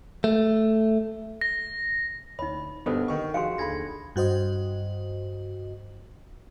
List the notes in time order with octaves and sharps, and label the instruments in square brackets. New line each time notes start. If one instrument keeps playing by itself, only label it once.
[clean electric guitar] A3
[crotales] A#6
[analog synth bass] D2 [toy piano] D#4 C#5 [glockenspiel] B5
[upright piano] G2 B2 [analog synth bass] B3 [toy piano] D4 A4 C5
[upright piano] D#3 C#6
[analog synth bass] F3 [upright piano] F#4 G#4 [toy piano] F5 G#5 C6 [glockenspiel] C#7
[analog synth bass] D#2 [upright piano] D3 G#4 B5 [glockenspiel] G#6 A#6
[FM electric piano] G2 F#4 C5 D#5